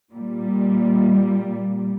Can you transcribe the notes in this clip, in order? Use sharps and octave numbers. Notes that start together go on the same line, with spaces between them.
A#2 G3